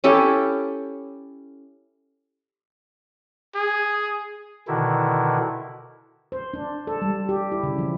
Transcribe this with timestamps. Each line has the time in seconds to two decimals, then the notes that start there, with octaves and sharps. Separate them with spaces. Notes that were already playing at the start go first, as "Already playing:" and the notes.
0.04 C#4 E4 G4 A4
3.55 G#4
4.68 B2 D3 D#3 E4
6.32 C5
6.54 D4
6.87 A4
7.02 G3
7.29 G4
7.52 E4
7.63 C#3
7.78 F3